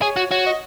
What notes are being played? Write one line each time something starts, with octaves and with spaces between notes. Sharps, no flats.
G#4 C#5
F#4
F#4 C#5
D#5